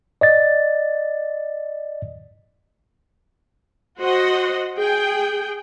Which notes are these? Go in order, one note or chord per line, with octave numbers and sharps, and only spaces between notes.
D5 D#5 A6
F#4 C5 D#5 F#5
G#4 G5